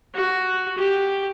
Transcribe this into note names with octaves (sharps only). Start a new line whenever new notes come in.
F#4
G4